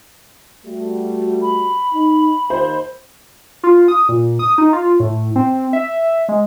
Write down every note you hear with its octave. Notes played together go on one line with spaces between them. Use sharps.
G3 A3 F#4
B5
D#4
D#2 C5
F4
D#6
A#2
D#6
D#4
F4
A2
C4
E5
G#3